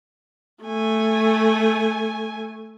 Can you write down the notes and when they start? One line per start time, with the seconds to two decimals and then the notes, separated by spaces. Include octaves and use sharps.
0.63 A3 G#5